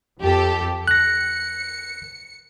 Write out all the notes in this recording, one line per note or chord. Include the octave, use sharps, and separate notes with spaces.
F2 G4 A4
F#6 A#6 C#7